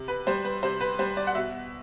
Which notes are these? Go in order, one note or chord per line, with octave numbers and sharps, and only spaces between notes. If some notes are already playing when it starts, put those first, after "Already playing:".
Already playing: C3
B4
G3 C5
B4
C3 C5
B4
G3 C5
D5
F#5
B2 E5